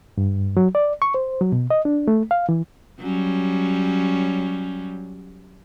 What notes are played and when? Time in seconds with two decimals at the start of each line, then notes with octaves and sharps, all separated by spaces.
0.18 G2
0.57 F#3
0.75 D5
1.02 C#6
1.14 C5
1.41 F#3
1.52 B2
1.71 D#5
1.85 D4
2.08 A3
2.31 F5
2.49 E3
3.00 F#3 G3 C#4